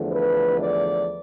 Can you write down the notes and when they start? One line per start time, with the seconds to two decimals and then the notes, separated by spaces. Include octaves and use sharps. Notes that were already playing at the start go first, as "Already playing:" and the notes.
Already playing: E2 D3 F3 A3
0.11 B4
0.61 D5